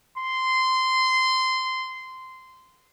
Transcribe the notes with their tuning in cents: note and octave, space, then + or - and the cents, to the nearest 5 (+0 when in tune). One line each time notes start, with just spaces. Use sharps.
C6 -15